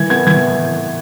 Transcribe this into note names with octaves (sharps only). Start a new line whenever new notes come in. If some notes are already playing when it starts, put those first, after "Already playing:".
Already playing: E3 G#6
B3 G#6
E3 G#6